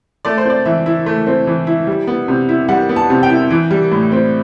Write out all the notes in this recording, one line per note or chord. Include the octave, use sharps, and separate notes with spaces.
A3 D5
C5
C4 D5
E3 E5
E4
A3
C4
E3
E4
G3
B3
C3
E4
G3 F#5
B3
A5
C3
G5
E4
E3
G3
A2
C4